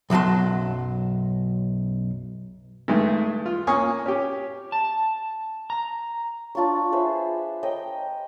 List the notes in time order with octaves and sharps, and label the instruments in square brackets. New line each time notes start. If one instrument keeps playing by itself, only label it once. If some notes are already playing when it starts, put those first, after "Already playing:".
[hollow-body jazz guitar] B1 F#2 F#3 A5 C6
[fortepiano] G2 D#3 G#3 A3
F4
A#3 C#4 G#5 C#6 D#6
C#4 G4
[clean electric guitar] A5
A#5
[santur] D4 F4 D5 C#6
G#4 B4 C5 E5
D#5 G5 A#5